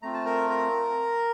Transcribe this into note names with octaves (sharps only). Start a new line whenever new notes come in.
A3 C4 F4 A#5
A5
A#4 A#5
A#4 A#5